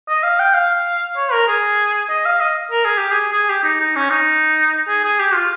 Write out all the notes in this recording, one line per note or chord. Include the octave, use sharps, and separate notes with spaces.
D#5
F5
G5
F5
C#5
A#4
G#4
D#5
F5
D#5
A#4
G#4
G4
G#4
G#4
G4
D#4
D#4
C#4
D#4
G#4
G#4
G4
F4